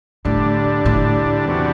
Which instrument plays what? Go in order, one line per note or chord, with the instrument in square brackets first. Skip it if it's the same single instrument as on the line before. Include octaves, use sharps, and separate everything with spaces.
[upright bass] A2 [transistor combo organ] D3 G3 D4
[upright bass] A2
[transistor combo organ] E2 C3 G3 D4 F#4